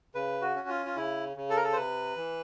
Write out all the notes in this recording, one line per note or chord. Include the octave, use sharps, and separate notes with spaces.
C#3 B4
F#4
C#4
F4
F4
C#3 E4
C#3
A4
A#4
A4
C5
C3 B4
E3